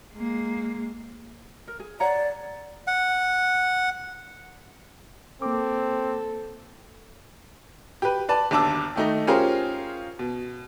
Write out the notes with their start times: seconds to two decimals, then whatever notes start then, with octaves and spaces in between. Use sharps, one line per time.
0.14 G#3 A#3
1.68 A#4
1.80 G#4
2.00 C#5 D5 F#5 A#5
2.87 F#5
5.42 A#3 C4 A4 D6
8.02 G4 B4
8.29 B4 D5 A5
8.51 G1 D#2 D4 A5 D6 E6
8.96 D#3 A3 D#4
9.27 C#4 F4 G4 G#4 A#4 C5
10.19 B2